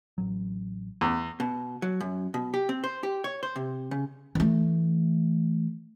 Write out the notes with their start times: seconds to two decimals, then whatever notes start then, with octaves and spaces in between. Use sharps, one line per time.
0.18 A1 F#3
1.01 E2
1.40 B2
1.82 F#3
2.00 F#2
2.34 B2
2.54 G4
2.69 C4
2.84 C5
3.03 G4
3.24 C#5
3.43 C5
3.56 C3
3.91 C#3
4.35 E3 A3